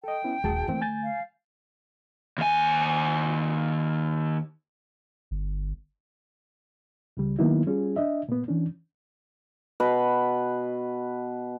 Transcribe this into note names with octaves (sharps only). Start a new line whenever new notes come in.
A4 D#5 G5
B3 C#4 E4
D#1 F#4 G#4 A5
D3 E3 A3 A#3 C4
G#5 G6 A6
F5
D#2 G#5
G1
C#2 C#3 G3
D#3 F#3 A#3 B3 D#4 E4
G3 C#4 F4 G#4
D4 D#5 E5
A#2 B3
E3 C#4 D4
B2 B4